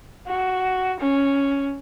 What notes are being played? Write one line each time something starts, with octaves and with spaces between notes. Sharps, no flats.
F#4
C#4